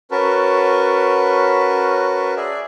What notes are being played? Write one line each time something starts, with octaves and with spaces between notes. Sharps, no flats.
C#4 F#4 A#4 B4 A5
G#4 D5 E5